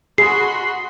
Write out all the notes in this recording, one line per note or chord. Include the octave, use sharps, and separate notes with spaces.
F#4 G#4 B5 C6 C7